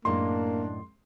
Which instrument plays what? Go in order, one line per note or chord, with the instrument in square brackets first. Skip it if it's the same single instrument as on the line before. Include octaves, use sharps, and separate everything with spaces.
[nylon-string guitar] F#2 A2 G#3 [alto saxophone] A#3 [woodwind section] D4 [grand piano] C6